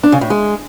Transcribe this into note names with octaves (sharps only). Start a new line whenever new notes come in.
D4
C#3
A2
G#3